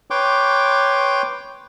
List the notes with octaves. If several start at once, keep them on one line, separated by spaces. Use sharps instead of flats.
B4 C#5 G5 C6 D6